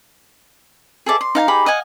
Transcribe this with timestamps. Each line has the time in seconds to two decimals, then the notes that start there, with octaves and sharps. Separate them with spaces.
1.06 G#4 A4 D5 E5
1.21 C6
1.35 D#4 F5 G#5 A#5
1.48 D#4 G4 G#4 B5
1.66 D#5 F5 F#5 G#5